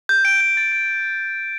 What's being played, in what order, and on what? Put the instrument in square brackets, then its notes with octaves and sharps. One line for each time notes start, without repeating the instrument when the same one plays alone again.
[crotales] G6
D7
G6
A6
D7